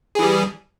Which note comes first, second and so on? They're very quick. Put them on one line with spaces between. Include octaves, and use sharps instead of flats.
G#4 E3 G3